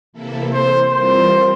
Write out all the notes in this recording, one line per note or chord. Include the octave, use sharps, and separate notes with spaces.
C3 E3 A#3 E4 A4
C5
E3 G3 C4 F4 A#4 C5